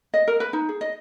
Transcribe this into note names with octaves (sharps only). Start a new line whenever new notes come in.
D#5
A#4
B4
D#4
G#4
D#5